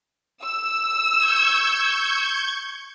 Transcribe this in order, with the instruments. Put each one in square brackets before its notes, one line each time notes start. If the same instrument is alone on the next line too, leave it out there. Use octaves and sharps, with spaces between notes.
[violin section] E6
[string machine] C#6 G6 G#6